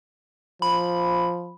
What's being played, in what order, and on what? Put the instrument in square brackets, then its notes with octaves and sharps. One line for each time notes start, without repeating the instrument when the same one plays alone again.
[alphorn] F3 [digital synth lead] B5